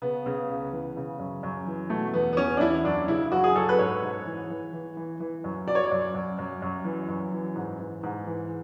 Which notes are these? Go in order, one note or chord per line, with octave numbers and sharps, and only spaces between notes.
C#3 B3
C#3
C#2
E3
C#3
F#2
F#2
E3
B2 A3
E2 B3
B3
E2 C#4
D4
E2 E4
F#2 D4
C#3 E4
F#2 F#4
G#4
F#2 A4
B4
G#2 C#5
G#2
E3
E3
E3
E3
E3
F#2
F#3 D5
C#5
D5
F#2
F#2
F#2
F#2
E3
F#2
E3
G#2
E3
G#2
E3